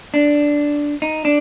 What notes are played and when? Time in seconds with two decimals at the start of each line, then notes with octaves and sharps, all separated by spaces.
0.14 D4
1.02 D#4
1.25 D4